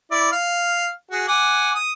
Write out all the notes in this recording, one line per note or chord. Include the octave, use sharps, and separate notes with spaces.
E4 D5
F5
F#4 G#4
F#5 G#5 D6
D#6